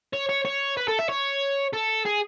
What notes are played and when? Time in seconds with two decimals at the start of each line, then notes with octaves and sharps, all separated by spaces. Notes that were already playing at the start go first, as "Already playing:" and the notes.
0.13 C#5
0.29 C#5
0.45 C#5
0.77 B4
0.88 A4
0.99 E5
1.09 C#5
1.74 A4
2.06 G#4